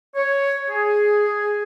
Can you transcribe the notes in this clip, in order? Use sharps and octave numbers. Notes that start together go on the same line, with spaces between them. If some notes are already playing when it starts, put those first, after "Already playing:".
C#5
G#4